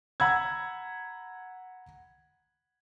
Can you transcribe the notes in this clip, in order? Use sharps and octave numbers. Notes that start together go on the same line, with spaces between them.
F#5 A#5 B5 E6 G#6